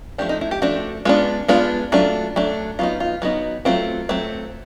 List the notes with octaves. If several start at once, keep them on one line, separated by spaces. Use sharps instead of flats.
F3 A3 D4 G4
D#4
E4
G4
F3 A3 D4 F#4
G#3 B3 D4 F4
G#3 B3 D4 F4
F#3 A3 D4 F4
F#3 A3 D4
F#3 B3 D#4 F4
F4
F#3 B3 D#4 F#4
F#3 A3 C4 F4
F#3 A3 C4